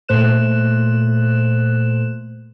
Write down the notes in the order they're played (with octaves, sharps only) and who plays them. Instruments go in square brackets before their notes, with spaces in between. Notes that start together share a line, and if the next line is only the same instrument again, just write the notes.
[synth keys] A#2 A3 C5 F#6 E7